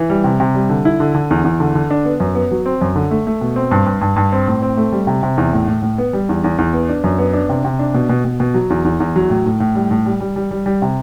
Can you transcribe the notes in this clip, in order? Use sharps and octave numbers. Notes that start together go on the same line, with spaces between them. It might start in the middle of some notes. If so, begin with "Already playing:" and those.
Already playing: E3
G3
C3
C3
G3
D3
E4
D3
D3
E2
E2
D3
D3
D4
B3
F#2
B3
F#3
C4
F#2
D3
A3
A3
B2
C4
G2
G2
G2
G2
C4
A2
C4
A3
G3
C3
C3
E2
A2
A2
A2
B3
G3
E2
E2
E2
B3
D4
F#2
B3
D4
C3
C3
D4
B2
B2
B2
B2
F#3
E2
E2
E2
F#3
A2
A2
A2
G3
A2
G3
G3
G3
G3
G3
C3